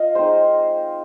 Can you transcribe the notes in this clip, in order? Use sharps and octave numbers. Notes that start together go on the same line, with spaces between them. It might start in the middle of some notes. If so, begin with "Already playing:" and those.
Already playing: F4 D#5 F5
G#3 C4 D#4 C5